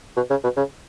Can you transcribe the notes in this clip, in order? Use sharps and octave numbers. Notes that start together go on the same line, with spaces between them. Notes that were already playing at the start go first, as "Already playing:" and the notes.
B2
C#3
B2
C#3